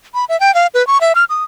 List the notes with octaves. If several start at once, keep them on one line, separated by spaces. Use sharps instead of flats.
B5
E5
G5
F5
B4
C#6
E5
F6
D#6